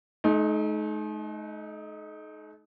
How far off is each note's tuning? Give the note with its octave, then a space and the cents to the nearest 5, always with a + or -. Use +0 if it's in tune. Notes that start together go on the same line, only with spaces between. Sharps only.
A3 -45 D#4 +0